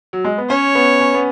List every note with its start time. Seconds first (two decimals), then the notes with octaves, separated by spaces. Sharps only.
0.13 F#3
0.24 G#3
0.38 B3
0.50 C#4 C#5
0.75 B3
1.01 C#4
1.14 B3